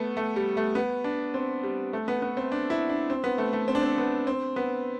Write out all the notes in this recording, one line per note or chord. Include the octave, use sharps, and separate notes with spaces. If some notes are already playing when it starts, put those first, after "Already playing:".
Already playing: A3 B3
A3
G3
A3
B3
D4
C4
G3
A3
B3
B3
C4
D4
E4
D4
C4
B3
A3
A3
C4
D4
C4
B3
C4
B3